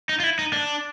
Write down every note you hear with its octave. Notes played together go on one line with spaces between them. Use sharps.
D#4
F4
E4
D#4
D4